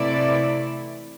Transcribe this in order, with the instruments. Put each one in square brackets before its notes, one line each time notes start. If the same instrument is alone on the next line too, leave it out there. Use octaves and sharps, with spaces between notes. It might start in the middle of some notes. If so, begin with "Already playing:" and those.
Already playing: [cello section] C3 E3 A3 E4 D5